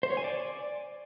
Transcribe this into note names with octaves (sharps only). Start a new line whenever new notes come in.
C5
C#5
G#5
D5